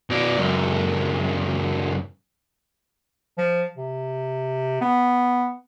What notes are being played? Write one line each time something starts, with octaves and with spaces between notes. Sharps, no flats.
B2 D5
C#2 F#2
F3
C3
B3